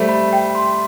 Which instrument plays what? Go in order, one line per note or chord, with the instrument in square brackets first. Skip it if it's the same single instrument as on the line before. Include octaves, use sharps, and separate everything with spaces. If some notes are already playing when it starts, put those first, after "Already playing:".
Already playing: [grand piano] G3 A3 [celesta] C5
[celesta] B5
G5
C6